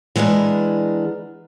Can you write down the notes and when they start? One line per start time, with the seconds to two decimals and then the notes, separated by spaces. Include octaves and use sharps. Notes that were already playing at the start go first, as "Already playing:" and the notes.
0.16 E3 G#3 B3 D4 A#4